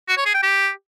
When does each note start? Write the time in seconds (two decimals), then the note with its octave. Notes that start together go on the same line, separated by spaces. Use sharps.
0.08 F#4
0.17 C#5
0.26 G#4
0.34 G5
0.43 G4